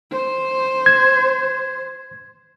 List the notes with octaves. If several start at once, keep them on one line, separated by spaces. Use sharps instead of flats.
C5
G#6